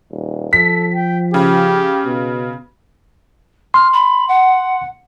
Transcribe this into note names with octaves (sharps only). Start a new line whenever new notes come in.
D#1
F3 A4 B6
G5
C#3 G4
B2
C6 F6
B5
F#5